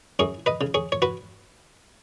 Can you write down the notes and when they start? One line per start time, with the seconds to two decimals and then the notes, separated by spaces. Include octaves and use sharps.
0.19 F#2 G#4 C#5
0.46 B4 D#5
0.61 C#3
0.74 G#4 C#5
0.92 C#5
1.02 F#4 B4